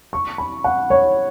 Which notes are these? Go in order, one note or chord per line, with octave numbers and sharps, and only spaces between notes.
C#6
B5
F#5
C#5